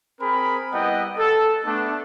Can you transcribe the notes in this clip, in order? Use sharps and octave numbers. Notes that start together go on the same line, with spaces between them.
C4 G#4 A#4 B5
G3 B3 E4 D#5 F#5 G5
A4
A3 B3 D4